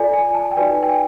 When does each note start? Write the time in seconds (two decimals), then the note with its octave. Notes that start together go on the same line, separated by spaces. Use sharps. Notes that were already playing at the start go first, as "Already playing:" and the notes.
Already playing: F4 A4 D5 G#5
0.13 G#5
0.35 A5
0.51 G5
0.57 D#4 F#4 B4 D5 G#5
0.83 G5
0.89 G#5